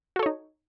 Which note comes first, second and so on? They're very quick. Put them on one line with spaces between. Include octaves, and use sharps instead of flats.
F#4 A4 C#5 D#4